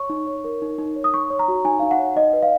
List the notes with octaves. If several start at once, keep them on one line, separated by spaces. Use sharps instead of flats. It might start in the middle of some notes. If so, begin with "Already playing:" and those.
Already playing: C#5 C#6
D#4
C#5
A#4
D#4
D#4
C#5
D#6
D#4 C#6
C#5
A#5
F#4
D#4 G#5
D#4 F5
F#5
C#5
D#4 D#5
B4
F5